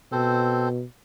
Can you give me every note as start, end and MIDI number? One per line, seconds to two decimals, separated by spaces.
0.12 0.84 47
0.12 0.69 60
0.12 0.69 69
0.12 0.69 72